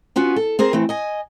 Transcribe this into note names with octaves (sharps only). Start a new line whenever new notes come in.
B3 C#4 F4 F#4
A4
C4 G#4 A#4 C5
E3 A3 C4
D#5 G#5